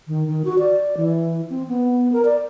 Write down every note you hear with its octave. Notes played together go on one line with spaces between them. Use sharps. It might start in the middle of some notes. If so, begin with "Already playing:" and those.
D#3
D#3
F#4
D5
E3
C4
B3
A#4
D5